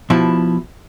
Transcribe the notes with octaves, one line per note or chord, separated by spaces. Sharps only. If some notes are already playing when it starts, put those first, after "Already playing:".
B2 F3 E4